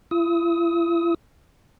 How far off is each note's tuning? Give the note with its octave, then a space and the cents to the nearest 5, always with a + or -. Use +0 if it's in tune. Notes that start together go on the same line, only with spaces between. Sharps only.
E4 +45 D#6 +35